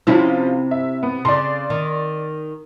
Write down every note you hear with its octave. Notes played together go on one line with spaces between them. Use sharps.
C3 F3 C4 C#4 E4 F4
E5
B3
C#3 D5 C6
D#3